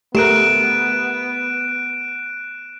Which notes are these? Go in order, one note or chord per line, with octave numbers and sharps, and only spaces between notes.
A3 B3 G4 A#4 F#6 D7 E7